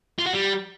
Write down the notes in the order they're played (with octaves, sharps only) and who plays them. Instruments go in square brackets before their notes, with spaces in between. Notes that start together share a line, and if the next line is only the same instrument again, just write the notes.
[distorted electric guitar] F4
F#4
G3